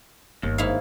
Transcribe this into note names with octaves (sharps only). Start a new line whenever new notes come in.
G1 D#2
G#2 E4 F5